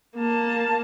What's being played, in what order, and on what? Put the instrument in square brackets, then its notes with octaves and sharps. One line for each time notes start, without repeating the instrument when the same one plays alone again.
[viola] A#3 A5